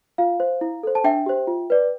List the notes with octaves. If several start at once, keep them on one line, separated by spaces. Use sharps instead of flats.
F4 F5
C5
E4
A4 C5
A5
D4 E5 G5
G4 C5
F4
B4 D5